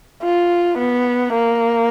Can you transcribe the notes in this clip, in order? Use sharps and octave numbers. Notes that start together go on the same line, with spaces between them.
F4
B3
A#3